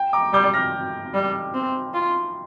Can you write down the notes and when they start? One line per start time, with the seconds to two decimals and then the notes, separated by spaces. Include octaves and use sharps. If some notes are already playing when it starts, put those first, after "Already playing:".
Already playing: G5
0.13 A#5 D6
0.33 G3 D6 G6
0.54 F6 A#6
1.14 G3
1.54 C4
1.94 F4